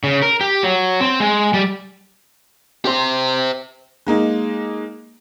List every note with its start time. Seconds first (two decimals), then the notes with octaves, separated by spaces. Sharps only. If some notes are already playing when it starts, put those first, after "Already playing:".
0.04 C#3
0.22 A#4
0.41 G4
0.63 F#3
1.01 C4
1.20 G#3
1.54 G3
2.85 G4 C5
4.07 G#3 A#3 D#4